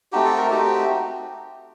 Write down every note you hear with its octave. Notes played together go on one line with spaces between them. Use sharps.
A3 C4 D#4 F#4 G4
A4
A#4
A3 C4 D#4 F#4 G4